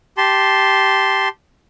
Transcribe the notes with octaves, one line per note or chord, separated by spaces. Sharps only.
G4 A5 C6